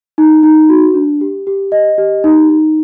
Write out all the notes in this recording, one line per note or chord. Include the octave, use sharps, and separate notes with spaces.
D#4
D#4
F#4
D4
G4
G4
D#5
G4
D#4
D#4